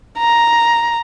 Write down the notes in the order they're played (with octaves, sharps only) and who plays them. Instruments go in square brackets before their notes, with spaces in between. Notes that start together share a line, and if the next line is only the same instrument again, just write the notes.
[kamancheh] A#5